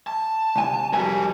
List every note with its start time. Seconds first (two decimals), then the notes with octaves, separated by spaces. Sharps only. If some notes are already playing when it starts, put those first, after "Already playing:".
0.07 A5
0.56 C2 G#5
0.93 F2 G3 F#4 A#4 G#5